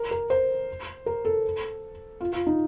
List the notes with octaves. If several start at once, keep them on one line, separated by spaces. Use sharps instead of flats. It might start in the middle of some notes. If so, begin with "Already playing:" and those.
Already playing: A#4
A#4
C5
A#4
A4
F4
F4
D#4